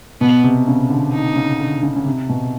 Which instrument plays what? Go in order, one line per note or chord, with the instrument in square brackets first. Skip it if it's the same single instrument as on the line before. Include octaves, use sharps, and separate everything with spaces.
[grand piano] B2 [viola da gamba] B3
[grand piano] C3
C#3
D3
[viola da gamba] D#4
[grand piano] C#3
D3
C#3
C#3
C3
B2